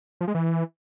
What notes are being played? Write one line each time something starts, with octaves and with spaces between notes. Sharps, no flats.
F3
G#3
E3